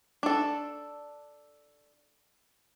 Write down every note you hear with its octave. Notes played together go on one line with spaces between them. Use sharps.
D4 A4